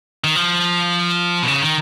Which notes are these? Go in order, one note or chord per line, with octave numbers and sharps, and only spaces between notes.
D#3
F3
B2
C#3
D#3